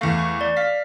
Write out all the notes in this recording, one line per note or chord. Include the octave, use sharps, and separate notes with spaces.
E2 A3 F5
C#6
D5
F5 B6